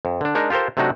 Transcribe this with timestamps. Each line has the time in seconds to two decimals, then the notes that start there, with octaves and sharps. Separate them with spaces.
0.05 F2
0.21 D3 D4
0.35 G#3 D4 D#4 A#4
0.50 F4 G4 A4 A#4 C5
0.77 C3 F#3 A3 D4 D#4 F#4